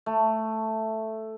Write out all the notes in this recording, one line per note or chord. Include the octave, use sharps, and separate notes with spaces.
A3